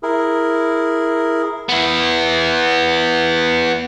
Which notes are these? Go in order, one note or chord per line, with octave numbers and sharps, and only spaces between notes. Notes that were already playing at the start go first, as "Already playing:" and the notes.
E4 G#4 A#4
B3 E4